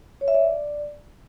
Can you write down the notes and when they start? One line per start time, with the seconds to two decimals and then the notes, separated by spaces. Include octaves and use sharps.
0.21 C#5
0.28 E5
0.34 D5